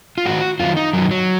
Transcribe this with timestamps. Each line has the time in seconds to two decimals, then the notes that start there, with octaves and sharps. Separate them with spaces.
0.18 F4
0.25 G#2 D#3 F#4
0.60 F#2 D#3 F4
0.77 D#4
0.93 F#2 D#3 F#3
1.11 F#3